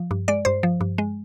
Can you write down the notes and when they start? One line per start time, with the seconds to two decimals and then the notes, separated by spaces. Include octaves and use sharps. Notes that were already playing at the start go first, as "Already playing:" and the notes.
Already playing: F3
0.11 G2
0.28 G#3 D5
0.45 G2 C5
0.63 F3
0.81 G2
0.98 G#3